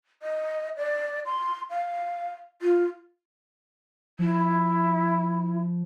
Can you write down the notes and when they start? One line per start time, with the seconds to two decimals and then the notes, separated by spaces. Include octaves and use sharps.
0.23 D#5
0.77 D5
1.26 C6
1.70 F5
2.62 F4
4.19 F3 E4